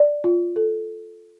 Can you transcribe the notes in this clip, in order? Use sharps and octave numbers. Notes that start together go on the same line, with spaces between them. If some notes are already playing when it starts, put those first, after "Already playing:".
Already playing: D5
F4
A4